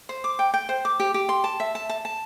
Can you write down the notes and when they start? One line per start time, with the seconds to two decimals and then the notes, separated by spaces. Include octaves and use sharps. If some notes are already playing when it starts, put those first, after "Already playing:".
0.09 C5
0.24 D6
0.39 G5
0.54 G5
0.69 C5
0.85 D6
1.00 G4
1.14 G4
1.29 C6
1.44 A5
1.60 E5
1.75 A5
1.90 A5
2.05 A5